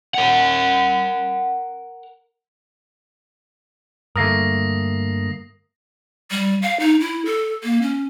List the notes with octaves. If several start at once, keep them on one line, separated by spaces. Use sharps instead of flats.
A#4 F#5
G2 D3 A3 A#3 A#4 D#6 A#6 C7
G3
F5
D#4
E4
A4
A#3
C#4